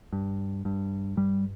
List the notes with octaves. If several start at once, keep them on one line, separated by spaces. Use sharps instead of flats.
G2
G2
G2 G3